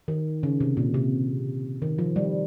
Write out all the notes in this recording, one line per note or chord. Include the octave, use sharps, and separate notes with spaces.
D#3
C#3
C3
A#2
C3
D#3
F3
G3